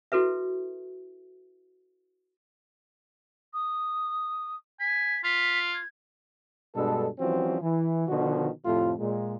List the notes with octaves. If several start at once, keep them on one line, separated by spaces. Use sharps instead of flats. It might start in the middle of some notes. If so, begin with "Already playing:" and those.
E4 F#4 A4 B4 E5
D#6
G#5 B6
F4 B6
G#6
G2 B2 G#3 D4 A4
E3 F3 G3 C4 C#4 F#4
E3
B2 D3 D#3 F3 F#4
F2 A2 C3 A3 F4
A#2 G#3